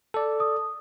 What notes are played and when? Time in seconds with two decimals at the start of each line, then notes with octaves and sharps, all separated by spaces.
0.14 A4 D5
0.40 D#6